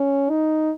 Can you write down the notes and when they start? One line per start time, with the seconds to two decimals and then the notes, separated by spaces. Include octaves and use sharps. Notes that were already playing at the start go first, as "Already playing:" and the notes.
Already playing: C#4
0.30 D#4